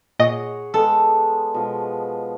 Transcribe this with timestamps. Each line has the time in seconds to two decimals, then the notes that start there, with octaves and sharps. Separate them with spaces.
0.19 A#2 G#4 C#5 D#5 F#5 D#6
0.74 G#3 B3 A4
1.54 B2 F3 G#3